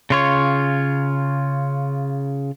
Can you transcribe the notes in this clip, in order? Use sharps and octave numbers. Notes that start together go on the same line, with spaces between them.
C#3 F4 C#5